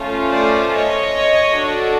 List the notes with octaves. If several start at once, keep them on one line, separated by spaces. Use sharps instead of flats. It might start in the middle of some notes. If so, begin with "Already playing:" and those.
Already playing: A3 C#4 F4
C5 D5
C#5 D#5
D4 F#4 A4